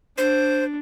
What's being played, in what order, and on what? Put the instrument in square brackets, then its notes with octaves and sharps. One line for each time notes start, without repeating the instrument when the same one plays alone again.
[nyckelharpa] D4 [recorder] C5